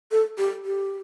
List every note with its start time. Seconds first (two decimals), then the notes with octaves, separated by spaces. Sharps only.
0.11 A4
0.38 G4
0.65 G4